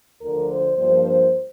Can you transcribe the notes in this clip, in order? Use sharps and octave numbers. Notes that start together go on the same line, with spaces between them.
D2 D3 F3 A#4
C5
G2 F3 A#3 D4 C5